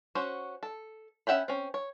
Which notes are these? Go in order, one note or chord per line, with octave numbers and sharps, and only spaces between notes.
C#4 F#4 C5
A4
C#4 E5 F#5 G5 B5
C4 C#4
C#5